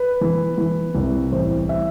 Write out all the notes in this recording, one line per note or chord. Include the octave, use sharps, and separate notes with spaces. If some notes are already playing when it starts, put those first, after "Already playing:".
Already playing: B4
E3
E3
C2
A1 C5
E5